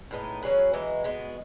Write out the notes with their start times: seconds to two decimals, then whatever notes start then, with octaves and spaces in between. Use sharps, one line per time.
0.11 A2 G#3 B3 D#4
0.43 F#3 C#4 G#4 B4
0.73 E3 G#3 D#4 F#4
1.04 G#3 B3 F#4